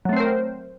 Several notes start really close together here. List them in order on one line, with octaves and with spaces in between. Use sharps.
F#3 A3 C4 C5 A#4